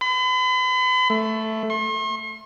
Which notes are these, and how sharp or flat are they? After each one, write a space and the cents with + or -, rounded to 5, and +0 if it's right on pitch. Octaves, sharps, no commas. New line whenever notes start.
B5 +40
A3 +0
C6 +45